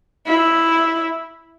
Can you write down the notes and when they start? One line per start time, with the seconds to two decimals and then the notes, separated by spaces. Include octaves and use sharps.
0.28 E4